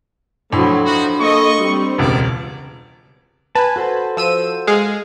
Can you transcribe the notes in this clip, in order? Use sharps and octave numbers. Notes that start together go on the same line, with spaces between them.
A2 D3 F3 F#3 D4 B5 C6
F3 D#4 F#4
A#3 A4 D#5 C#6
G3 C4
E1 C#2 A#4 D5
B4 G#5 A5
F#4 A4 C5
F3 E6 D#7
G#3 G#4 F5